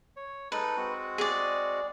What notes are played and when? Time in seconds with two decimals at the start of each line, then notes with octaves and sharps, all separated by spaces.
0.16 C#5
0.52 G#3 D#4 A4 B4
0.77 G#3 C4 F#4
1.18 G#4 D5